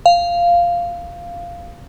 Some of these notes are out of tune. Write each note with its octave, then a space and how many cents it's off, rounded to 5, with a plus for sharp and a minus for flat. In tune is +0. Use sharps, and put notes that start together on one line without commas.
F5 -5